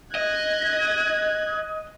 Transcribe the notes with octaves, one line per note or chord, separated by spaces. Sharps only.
D#5 F#6 G#6